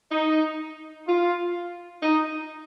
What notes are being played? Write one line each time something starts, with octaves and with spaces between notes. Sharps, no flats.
D#4
F4
D#4